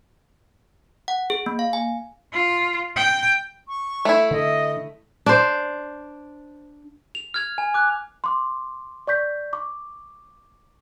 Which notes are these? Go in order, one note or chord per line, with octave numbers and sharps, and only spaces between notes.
F#5
G#4
A#3
F5
G#5
F4
G5
C#6
A3 E4
D3 D#5
D4 C5
F7
F6 G#6 F7
G#5
D6 F#6
C6 D6
D5 C#6 G6 B6
C#6 D6